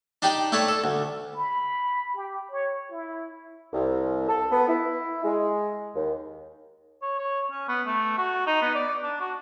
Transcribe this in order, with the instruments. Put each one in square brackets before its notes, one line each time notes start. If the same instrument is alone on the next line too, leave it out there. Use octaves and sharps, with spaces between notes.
[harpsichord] D4 D#4 G4 D5 G5
A3 D4 C#5 A5 B5
A4
D2
[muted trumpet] B5
G4
C#5
E4
[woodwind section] C2
A4
B3
E4
G#3
D#2
[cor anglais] C#5
C#5
C#4
B3
A3
F#4
D#4
B3
D5
D4
F#4